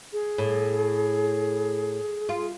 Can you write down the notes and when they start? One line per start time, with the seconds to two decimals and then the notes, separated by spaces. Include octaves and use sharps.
0.13 G#4
0.38 A2
2.29 F4